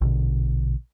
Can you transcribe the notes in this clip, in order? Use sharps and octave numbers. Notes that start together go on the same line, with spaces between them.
A#1 B2 D3